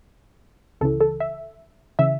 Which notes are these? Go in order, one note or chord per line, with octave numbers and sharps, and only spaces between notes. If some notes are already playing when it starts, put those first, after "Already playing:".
C#2 C#3 E3 A4
A4
E5
C#3 E3 E5